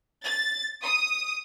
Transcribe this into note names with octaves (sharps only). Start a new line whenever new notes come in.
A6
D#6